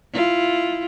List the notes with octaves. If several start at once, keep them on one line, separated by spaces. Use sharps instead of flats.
E4 F4